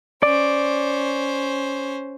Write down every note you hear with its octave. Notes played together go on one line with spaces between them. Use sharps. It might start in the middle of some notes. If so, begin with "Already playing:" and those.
C#4 C5 D5